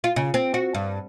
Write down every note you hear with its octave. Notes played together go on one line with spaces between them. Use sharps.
F4
C#3
C4
F#4
G2